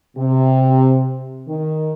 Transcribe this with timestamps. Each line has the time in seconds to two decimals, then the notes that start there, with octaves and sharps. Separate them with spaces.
0.17 C3
1.48 D#3